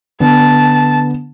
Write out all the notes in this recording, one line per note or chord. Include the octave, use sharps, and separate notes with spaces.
D3 B3 D4 A5